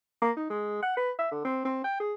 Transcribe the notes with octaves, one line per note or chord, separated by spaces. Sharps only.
A#3
D#4
G#3
F#5
B4
E5
D3
C4
C4
G5
G#4